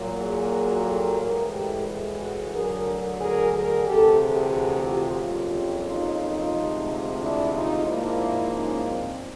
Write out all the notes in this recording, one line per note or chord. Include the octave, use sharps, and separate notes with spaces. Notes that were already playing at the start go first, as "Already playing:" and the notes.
Already playing: A#2 F#3 A#3
F#4 G#4
G4 A4
A2 E3 G#3 G#4 A#4
G4 A4
F#4 G#4
F#4 G#4
D2 D3 F#3 G#4 A#4
G#4 A#4
G#4 A#4
D2 C3 E3 G4 A4
F#4 G#4
F4 G4
F2 C#3 F#3 A#3 F4 G4
D#4 F4
D#4 F4
D2 C3 F3 G#3
D4 E4
D#4 F4
G#2 F3 A#3 D4 E4
C#4 D#4
C4 D4